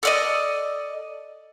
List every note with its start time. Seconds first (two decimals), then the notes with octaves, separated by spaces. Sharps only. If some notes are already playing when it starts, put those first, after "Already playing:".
0.03 A4 D5 D#5